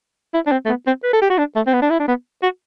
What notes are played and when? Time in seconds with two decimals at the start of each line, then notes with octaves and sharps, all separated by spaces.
0.34 E4
0.47 D4
0.51 C4
0.65 A3
0.69 B3
0.87 C4
1.03 B4
1.13 A4
1.22 G4
1.30 F#4
1.38 D4
1.56 A3
1.67 C4
1.73 B3
1.82 D4
1.90 E4
1.99 D4
2.08 B3
2.43 F#4